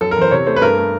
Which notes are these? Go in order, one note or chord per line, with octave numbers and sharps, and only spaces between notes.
F#2 A4
A#4
E3 C5
C3 C#5
A3 C5
B4
G2 A#4
A3